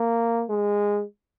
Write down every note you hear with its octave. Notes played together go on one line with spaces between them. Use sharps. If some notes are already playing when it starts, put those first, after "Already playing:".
Already playing: A#3
G#3